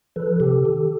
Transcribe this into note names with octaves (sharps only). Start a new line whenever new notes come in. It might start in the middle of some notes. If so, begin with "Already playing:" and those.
F3 A4 B4
C3 G4 A4
D#3